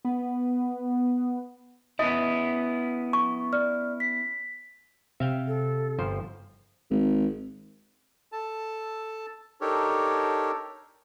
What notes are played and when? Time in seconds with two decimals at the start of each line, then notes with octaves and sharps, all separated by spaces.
0.05 B3
1.99 B3 C#4 E4 D#5 D#6
3.13 C#6
3.53 D5 F6
4.00 B6
5.20 C3 E5 F5 G5
5.47 A4
5.98 G1 F3 C5
6.90 G#1
8.32 A4 A5
9.61 D4 D#4 G4 A4 A#4 C#5